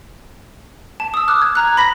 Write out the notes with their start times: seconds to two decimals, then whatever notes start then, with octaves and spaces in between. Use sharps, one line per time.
1.00 A5
1.14 D#6 E6
1.28 D6 F6 F#6
1.42 G#6
1.55 A#5 F#6
1.77 B5 A#6 B6